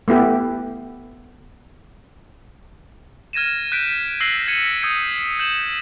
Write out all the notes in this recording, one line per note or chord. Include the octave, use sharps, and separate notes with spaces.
A3 B3 E4 G4
F6 G#6 A#6 D#7 E7
F#6 G6 B6 D7
E6 F#6 A#6 C7 F#7 G7
G#6 A#6 B6 C#7 D#7
D#6 E6 G6 G#6 C#7
G6 E7 F#7